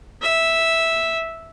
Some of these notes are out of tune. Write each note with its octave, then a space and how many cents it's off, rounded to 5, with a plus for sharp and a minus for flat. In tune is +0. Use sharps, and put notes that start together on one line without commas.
E5 -5